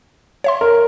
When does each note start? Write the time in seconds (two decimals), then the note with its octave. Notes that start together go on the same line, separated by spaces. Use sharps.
0.44 C#5 E5 C6
0.61 A#4